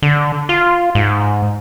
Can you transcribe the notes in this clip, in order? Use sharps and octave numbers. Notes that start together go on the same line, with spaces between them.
D3
F4
G#2